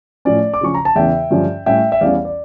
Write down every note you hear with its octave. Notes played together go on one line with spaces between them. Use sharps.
A2 F3 C#4 D5
D6
C#3 F3 C#4 C#6
A#5
A5
E2 C#3 E3 E5 G5
G2 D3 F3 C#4
A2 G3 C#4 E5 G5
E5
E2 E3 G3 C#4 D5 F5
D5